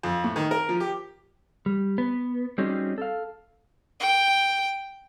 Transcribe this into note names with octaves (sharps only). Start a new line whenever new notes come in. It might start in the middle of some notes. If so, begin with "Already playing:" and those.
F2
A2
D#3
A#4
F3
G4
G3
B3
G3 C4 C#4 D#4 F#4 G#4
A4 F5
G5